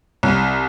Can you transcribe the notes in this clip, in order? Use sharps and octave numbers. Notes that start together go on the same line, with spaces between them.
C2